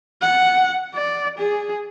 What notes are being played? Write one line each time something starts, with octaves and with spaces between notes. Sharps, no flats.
F#5
D5
G#4